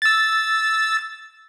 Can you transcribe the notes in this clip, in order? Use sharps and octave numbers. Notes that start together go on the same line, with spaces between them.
E6 A6